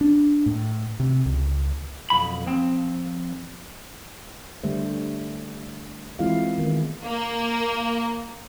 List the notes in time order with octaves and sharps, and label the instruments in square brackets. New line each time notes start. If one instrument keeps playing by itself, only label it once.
[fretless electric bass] D4
A2
C3
C#2
[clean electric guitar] B1 F2 B5
F3 C4
[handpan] D3 G3 A3 C5
E3 G#3 C4 E4 F4 F5
D#3 A3 B3
[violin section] A#3